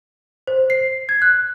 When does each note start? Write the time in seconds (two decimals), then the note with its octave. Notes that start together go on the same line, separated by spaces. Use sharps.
0.47 C5
0.70 C7
1.09 G#6
1.22 F#6